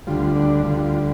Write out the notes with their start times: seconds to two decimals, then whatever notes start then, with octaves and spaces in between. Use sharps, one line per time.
0.07 D2 D3 G3 F4
0.36 D4
0.64 D2 D3 G3 F4
0.84 F4